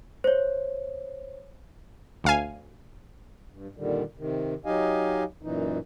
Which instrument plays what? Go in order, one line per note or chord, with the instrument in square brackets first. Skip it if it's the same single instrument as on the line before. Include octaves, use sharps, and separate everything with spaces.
[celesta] C5 C#5
[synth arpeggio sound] D2 F5 G#5
[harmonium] G2
A#2 D3 D#3 G3
C3 D#3
F#3 D#4 G4 D#5 F5 G#5
F#2 A#2 E3 D#4